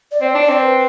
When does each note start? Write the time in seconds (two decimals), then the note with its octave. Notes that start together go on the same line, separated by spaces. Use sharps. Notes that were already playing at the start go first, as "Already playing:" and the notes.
0.12 D5
0.21 C4 C5
0.31 D5
0.35 D4
0.42 D5
0.49 C4 C5
0.62 B4